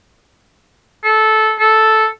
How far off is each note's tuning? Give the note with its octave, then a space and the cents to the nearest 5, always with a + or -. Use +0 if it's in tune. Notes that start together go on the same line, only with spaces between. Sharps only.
A4 -15
A4 -5